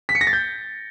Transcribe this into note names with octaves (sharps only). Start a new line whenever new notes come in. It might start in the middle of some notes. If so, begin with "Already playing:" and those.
B6
C#7
A#6
A6
G6